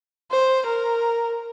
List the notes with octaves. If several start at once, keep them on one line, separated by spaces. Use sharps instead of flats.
C5
A#4